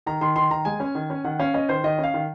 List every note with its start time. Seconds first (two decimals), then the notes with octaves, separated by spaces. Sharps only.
0.06 D#3 A#5
0.21 D#3 C6
0.36 D#3 C6
0.51 D#3 A#5
0.65 G#3 G#5
0.80 C#4
0.95 D#3
1.10 C#4
1.24 D#3 F#5
1.39 C#4 F5
1.54 C#4 D#5
1.69 D#3 C5
1.84 D#3 D#5
1.98 C#4
2.03 F5
2.14 D#3